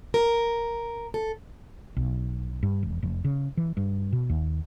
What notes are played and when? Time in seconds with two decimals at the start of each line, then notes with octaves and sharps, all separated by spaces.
0.14 A#4
1.14 A4
1.97 B1
2.63 G2
2.83 E1
3.03 F1
3.25 C#3
3.57 E3
3.77 G2
4.13 B2
4.29 D#2